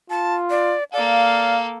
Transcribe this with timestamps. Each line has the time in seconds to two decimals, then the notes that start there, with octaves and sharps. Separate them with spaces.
0.10 F4 A5
0.50 D5
0.93 A#3 A4 D5 F5